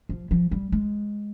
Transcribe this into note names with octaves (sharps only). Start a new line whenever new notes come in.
F3
F3
G3
G#3